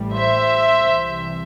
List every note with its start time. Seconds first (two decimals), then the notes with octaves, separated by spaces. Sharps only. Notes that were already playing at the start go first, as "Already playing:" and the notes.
Already playing: A1 A2 G3
0.15 C5 E5
0.75 C2 C3 E3